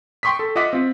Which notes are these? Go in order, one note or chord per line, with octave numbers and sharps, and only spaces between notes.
G5 C6 C#6 D#6 B6
A4
F4 D#5 E5 F#5 D6 B6
C4 F4